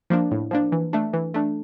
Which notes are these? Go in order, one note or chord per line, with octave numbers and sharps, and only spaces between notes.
F3 A#3 D4
A2
F3 A#3 D4
E3
A3 D4
E3
A3 D4